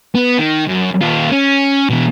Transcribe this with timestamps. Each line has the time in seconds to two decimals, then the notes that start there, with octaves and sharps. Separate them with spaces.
0.15 B3
0.39 D#3
0.68 F#2
1.02 D#2 F4
1.31 C#4
1.90 B2 E3